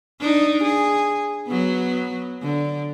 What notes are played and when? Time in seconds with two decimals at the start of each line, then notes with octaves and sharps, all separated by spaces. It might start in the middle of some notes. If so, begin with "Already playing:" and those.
0.20 D4 D#4
0.64 G#4
1.47 F#3 B3
2.42 D3